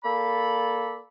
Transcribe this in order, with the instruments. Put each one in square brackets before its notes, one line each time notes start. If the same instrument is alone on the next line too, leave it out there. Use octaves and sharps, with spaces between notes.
[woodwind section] A#3 A4 D5 B5